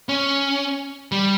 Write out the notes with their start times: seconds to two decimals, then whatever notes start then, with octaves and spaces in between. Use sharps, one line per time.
0.09 C#4
1.12 G3